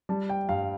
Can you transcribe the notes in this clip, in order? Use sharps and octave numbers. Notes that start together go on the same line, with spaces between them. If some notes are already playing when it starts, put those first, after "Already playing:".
G3 A5
G5
G2 F5